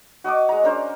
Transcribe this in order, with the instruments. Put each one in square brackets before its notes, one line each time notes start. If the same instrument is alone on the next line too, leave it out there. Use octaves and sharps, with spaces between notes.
[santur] F#4 D#5 C#6 D6
G#3 A#5
C#4 D4 A#4 C5